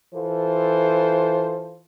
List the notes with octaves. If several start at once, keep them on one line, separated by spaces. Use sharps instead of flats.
E3 F4 A4 C5